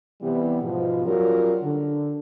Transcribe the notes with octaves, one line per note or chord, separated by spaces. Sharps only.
C3 E3 G3 B3 G4
G#2 B2 F3
F#3 G3 C#4 F4 F#4 A#4
D3